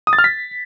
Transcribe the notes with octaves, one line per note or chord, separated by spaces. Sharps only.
D#6
A6
F6
B6